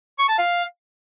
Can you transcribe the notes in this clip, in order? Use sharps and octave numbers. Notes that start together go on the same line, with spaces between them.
C#6
A5
F5